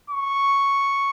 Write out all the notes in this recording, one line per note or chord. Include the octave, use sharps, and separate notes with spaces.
C#6